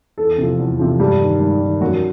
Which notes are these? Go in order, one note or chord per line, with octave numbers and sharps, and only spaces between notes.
E2 A4
C3 F3
E2
C3 F3
G2 G4
D#3
G2
D#3
F#2 F#4